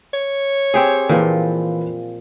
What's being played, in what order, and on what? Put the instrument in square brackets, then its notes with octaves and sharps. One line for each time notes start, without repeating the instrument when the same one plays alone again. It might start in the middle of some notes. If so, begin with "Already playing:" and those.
[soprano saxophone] C#5
[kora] C4 G4 G#4
[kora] A#2 F3 [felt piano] E3 G#4 B4